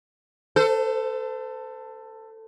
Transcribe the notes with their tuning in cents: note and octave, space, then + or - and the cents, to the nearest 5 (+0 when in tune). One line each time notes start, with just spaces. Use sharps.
A4 +15 C5 -35